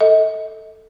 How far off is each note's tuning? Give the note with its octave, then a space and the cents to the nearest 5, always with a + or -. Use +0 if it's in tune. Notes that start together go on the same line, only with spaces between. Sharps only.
A4 +10 D#5 +35